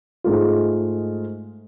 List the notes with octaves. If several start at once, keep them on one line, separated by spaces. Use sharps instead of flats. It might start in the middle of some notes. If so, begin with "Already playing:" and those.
G#2 G#3 A3 F4